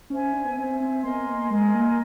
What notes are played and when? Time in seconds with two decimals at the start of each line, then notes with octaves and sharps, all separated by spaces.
0.10 C#4 C5 E5 G#5
0.33 D4
0.45 B3
0.56 C4 C5 E5 G#5
0.80 C4
1.04 B3 A#4 D#5 G#5 C6
1.26 A#3
1.50 G#3 A#4 D#5 G#5 C6
1.74 A#3